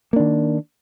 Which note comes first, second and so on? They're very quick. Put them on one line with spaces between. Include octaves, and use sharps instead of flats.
A#3 D4 D#3